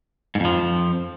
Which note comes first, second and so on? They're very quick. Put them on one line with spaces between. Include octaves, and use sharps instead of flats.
G#2 F2 F3